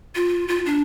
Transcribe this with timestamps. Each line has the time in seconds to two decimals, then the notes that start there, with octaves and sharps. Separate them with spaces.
0.15 F4
0.48 F4
0.66 D4